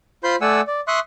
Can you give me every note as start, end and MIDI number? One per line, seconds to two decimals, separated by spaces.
0.24 0.36 65
0.24 0.36 72
0.24 0.36 83
0.24 0.36 84
0.24 0.36 91
0.42 0.61 57
0.42 0.61 74
0.42 0.61 78
0.42 0.61 80
0.42 0.61 88
0.68 0.81 74
0.88 1.00 76
0.88 1.00 84
0.88 1.00 85
0.88 1.00 87
0.88 1.00 90